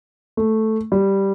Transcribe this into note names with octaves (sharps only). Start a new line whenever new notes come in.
A3
G3